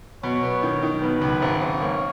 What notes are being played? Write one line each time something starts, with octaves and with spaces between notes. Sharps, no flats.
B2 C#5
B3
D#3
D#3
B2 B4
C#2
G#1
G#2
A#3 C#5